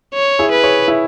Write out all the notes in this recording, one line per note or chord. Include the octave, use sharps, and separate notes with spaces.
C#5
E4 G#4
B4
G#4 C#5
E4 G#4